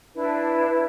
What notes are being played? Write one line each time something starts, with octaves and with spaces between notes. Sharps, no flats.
D4 E4 B4